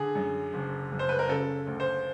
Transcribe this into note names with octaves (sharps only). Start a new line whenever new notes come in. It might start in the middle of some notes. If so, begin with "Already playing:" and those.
Already playing: D3 G#4
F#2
F#1
F#1
C5
B4
A#4
C#3 A4
D2
C5